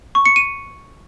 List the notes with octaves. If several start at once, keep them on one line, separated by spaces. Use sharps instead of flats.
C#6
C#7
D#7